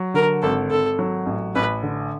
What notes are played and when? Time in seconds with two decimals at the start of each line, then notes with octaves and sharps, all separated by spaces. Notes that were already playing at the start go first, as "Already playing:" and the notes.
Already playing: F#3
0.14 D3 A#4
0.42 G#1 A4
0.71 G#1 A4
0.99 F#3
1.26 A1
1.55 A1 B4
1.83 D3